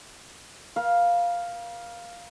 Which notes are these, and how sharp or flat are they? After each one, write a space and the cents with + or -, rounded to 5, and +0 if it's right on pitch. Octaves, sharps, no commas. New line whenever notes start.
A#4 +45 F5 +0